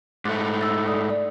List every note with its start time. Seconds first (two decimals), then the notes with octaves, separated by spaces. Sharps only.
0.25 G#2 A3 D6 F#6 A6
0.61 E6 A6
0.87 A4 D5 D#6
1.10 D5